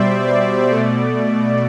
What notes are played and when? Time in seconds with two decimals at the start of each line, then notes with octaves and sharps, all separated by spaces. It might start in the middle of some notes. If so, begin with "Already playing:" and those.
Already playing: B2 G3 C5 D5 E5
0.28 D5
0.71 B2 A3